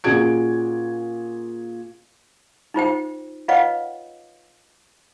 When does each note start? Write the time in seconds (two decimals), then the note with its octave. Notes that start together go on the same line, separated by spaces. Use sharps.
0.04 A#2 C#4 F#4 G#4 G#6 D7
2.74 D#4 F4 C5 G5
3.48 F4 B4 C#5 D#5 F5 F#5